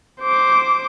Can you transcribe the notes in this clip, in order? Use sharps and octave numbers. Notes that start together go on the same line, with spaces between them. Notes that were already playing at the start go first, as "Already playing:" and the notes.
C5 D6